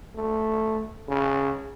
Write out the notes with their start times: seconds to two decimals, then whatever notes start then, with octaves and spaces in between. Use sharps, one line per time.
0.16 A3
1.08 C#3